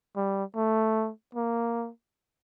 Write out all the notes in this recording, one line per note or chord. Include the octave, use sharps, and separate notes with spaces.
G3
A3
A#3